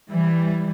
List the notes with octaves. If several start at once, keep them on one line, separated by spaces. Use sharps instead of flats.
E3 G3